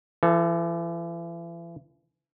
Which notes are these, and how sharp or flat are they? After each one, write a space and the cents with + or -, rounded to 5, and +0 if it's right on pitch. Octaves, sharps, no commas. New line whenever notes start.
E3 +40 A4 +0